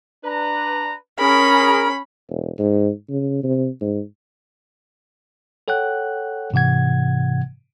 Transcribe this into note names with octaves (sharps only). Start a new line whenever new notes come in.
D4 B4 A#5
C#4 G#4 A#4 B5
E1
G#2
C#3
C3
G#2
A4 C#5 F#5 G5 F#6
G#2 C3 E3 F#5 G#6